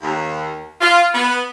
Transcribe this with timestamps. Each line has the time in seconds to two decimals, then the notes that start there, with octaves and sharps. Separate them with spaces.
0.02 D#2
0.81 F4
1.14 B3